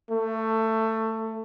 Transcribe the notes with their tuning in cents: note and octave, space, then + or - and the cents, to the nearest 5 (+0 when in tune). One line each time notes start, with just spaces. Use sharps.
A3 +20